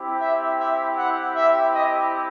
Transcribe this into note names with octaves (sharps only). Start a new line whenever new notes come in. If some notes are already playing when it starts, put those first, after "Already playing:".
Already playing: C4 E4 G4
E5
E5
F#5
E5
D#5